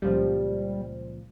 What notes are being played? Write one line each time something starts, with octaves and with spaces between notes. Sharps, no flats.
C#2 A#2 F3 G3